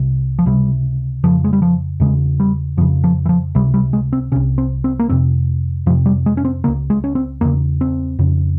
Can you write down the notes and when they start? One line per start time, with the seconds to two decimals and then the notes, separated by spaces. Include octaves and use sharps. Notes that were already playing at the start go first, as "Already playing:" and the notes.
Already playing: C2 C3
0.39 F3
0.46 C#2 C3 G3
1.23 F2 C#3 F3
1.44 G#3
1.53 G3
1.62 F3
2.00 E2 C#3 G#3
2.40 G3
2.77 F2 F3
2.81 C#3
3.04 F3
3.26 E3
3.29 F3
3.55 C#2 C3 G3
3.74 G3
3.93 G#3
4.13 C4
4.32 C3 C#4
4.36 C2
4.58 C4
4.84 C4
4.99 A#3
5.09 F2 C3 C4
5.86 F2 F3
5.89 C3
6.06 G3
6.26 G#3
6.37 C#4
6.45 C4
6.64 C#2 C#3 A#3
6.90 G#3
7.04 C#4
7.15 C4
7.41 E2 C#3 A#3
7.81 C4
8.19 F2 C#3